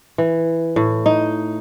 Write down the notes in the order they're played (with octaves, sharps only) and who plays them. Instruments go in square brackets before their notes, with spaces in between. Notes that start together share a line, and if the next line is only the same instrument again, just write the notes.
[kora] E3
A2
D#4